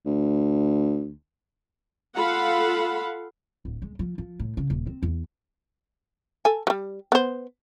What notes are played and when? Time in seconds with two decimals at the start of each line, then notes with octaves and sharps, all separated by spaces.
0.06 D2
2.16 F4 A4 F5 F#5 B5
3.65 D1
3.82 G#3
3.99 F3
4.18 F3
4.39 A2
4.57 C#3
4.70 D#1
4.87 C4
5.03 E2
6.45 A4 G#5
6.67 F#3 G3
7.12 B3 C5